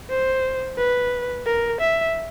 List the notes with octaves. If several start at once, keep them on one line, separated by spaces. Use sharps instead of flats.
C5
B4
A#4
E5